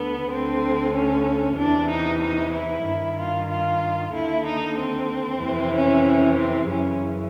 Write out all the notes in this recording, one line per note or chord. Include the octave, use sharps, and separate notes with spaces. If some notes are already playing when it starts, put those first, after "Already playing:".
Already playing: D2 D3 B3
D2 D3 C4
C#4
E2 C3 E3 D4
D#4
D#4
E4
G2 D#3
F4
F4
D#2 D3 E4
D#4
C4
F2 C3 E3
C#4
C4
F#2 C#3 E3 C#4